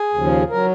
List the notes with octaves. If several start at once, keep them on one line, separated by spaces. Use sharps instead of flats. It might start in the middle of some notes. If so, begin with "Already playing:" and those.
Already playing: G#4
D#2 C#3 F3
F#3 A#4